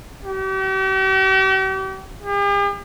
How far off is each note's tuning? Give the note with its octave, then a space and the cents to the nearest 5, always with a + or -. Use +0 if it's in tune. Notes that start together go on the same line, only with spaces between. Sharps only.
G4 -45
G4 +45